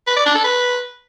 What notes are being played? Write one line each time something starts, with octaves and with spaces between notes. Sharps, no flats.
B4
D5
D4
A4
B4